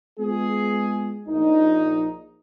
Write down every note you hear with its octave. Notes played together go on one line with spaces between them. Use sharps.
G#3 B3 F4 G#4
A#1 D#4